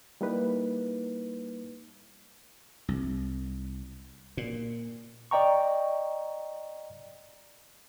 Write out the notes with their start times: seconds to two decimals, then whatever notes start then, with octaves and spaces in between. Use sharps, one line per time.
0.21 G3 A#3 D#4 E4 B4
2.88 C2
4.37 A#2
5.31 D5 D#5 G5 A#5 C#6